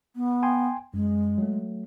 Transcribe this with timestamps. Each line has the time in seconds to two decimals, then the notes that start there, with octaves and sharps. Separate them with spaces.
0.16 B3
0.43 G5 G#5 C6
0.94 F#2 G#3
1.38 F#3 A3